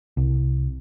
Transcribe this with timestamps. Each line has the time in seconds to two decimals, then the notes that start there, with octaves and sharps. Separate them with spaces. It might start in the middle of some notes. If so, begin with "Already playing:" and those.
0.17 C2